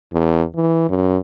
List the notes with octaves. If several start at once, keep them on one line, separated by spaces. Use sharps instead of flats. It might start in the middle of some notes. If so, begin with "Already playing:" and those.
E2
E3
F#2